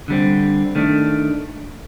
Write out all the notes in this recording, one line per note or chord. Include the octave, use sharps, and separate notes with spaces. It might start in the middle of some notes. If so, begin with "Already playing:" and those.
D3 G3 C4
D#3 A3 D4